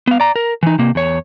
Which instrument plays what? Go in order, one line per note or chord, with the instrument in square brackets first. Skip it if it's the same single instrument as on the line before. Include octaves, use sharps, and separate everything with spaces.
[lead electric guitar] B3 F5
D5 A#5
A#4
E3 D#4
C3 A#3
E2 C#5